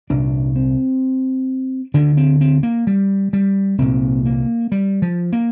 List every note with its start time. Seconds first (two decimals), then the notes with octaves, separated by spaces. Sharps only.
0.10 C2 A#2 D4
0.56 C4
1.94 D2 D3 D4
2.17 C4
2.41 C4
2.63 A#3
2.87 G3
3.33 G3
3.78 C2 A#2 C4
4.25 A#3
4.72 G3
5.02 F3
5.32 A#3